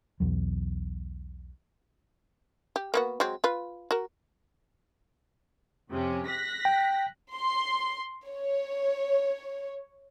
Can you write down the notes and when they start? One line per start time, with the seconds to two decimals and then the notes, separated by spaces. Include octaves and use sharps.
0.20 B1 E2 F#3
2.76 G4
2.94 A#3 B3 F#4
3.20 F#3 G#3 C4
3.44 F4 B4
3.91 F#4 A#4
5.90 F2 C3 C#4
6.27 F#6 A#6 B6
6.65 G5
7.33 C6
8.27 C#5